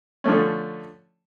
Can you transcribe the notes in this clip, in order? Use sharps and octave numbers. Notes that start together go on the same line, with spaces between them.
D3 F3 A3 C#4